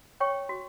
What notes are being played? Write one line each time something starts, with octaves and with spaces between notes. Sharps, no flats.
C#5 G5 C#6
F#4